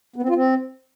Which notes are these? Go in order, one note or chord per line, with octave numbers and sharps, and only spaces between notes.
B3
C4
F4
C4